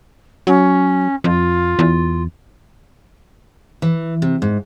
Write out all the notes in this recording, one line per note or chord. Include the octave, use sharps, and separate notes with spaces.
F#3 C#4
F2 F4
E2
E3
C3
G#2